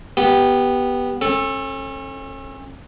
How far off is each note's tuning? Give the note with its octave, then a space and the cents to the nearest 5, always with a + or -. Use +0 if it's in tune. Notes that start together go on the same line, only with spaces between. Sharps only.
B3 -10 G4 +0
C#4 -40 A4 +0